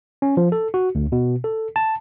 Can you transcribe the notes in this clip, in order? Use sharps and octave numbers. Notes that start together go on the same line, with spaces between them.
C#4
F3
A4
F#4
D2
B2
A4
A5